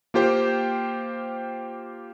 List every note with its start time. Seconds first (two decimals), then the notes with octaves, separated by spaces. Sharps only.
0.14 A#3 F4 G4 C5 G5